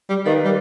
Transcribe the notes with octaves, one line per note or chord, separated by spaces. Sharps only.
G3
D#3 G4 B4 D5 F5
G3